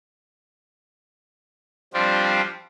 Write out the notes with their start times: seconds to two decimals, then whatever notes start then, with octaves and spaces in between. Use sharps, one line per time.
1.94 F3 G3 C4 D4 F4